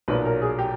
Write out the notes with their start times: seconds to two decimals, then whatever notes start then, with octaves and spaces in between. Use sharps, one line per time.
0.08 B1 A#2 F#3 B4
0.25 A#4
0.42 G#4
0.59 G4